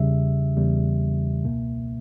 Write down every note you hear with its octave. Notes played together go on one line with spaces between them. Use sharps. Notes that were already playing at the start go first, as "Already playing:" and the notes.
Already playing: E2 C#3 G3 E5
E2 C#3 G3
C#2 B2 A#3